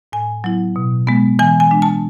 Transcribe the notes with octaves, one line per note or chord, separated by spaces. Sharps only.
A2 G#5
F#3 B3 E4
B2
G#3 B3
E3 G#5
G#5
G#3 D4
A5